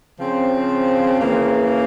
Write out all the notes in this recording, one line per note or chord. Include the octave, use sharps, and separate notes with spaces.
C#3 F3 C4
C#3 E3 A#3